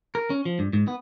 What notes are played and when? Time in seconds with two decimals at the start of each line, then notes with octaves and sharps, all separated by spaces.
0.15 A#4
0.30 C#4
0.45 F3
0.59 G2
0.73 G#2
0.88 B3